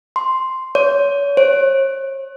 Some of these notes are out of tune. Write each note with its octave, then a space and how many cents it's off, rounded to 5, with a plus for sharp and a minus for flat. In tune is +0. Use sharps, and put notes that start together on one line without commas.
C6 +0
C#5 +35
C#5 -45